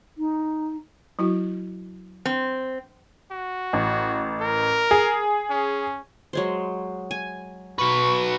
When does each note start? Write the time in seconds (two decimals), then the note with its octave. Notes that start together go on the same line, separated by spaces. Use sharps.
0.18 D#4
1.19 F#3 E4 F#4
2.25 C4
3.31 F#4
3.73 A1
4.41 A#4
4.91 G#4
5.50 C#4
6.33 F#3 G#3 C5
7.11 G#5
7.78 F#3 B4 C#6